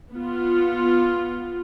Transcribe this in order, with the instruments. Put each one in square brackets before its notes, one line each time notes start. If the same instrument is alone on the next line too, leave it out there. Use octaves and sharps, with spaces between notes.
[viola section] B3 F4